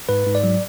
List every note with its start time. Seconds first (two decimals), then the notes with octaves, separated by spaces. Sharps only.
0.09 G#2 B4
0.27 G#2
0.35 D5
0.44 F#3